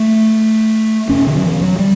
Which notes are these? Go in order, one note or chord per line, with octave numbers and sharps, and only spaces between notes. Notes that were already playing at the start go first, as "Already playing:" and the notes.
Already playing: A3
E2 B2 C#4
D3
F#3
E3
F#3
G3